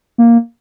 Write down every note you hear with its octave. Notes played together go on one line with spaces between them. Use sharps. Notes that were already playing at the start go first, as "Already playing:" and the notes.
A#3